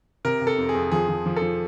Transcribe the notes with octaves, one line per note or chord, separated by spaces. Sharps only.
C3 A#4
C3
A4
F2
G#4
F2
F3 G#4
F3
F3
A4
F3